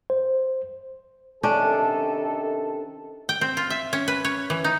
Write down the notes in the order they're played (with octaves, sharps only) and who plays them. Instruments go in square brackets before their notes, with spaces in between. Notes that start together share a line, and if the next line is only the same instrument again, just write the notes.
[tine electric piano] C5
[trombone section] C3 D#3 A4 [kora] C#4 D4
[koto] G5
C4
F4
E5
C#4
B4
C#5
E3
D#4